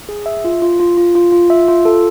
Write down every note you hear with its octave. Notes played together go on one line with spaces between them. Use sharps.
G#4
E5
F4
F4
F4
F4
F4
F4
E5
F4
A4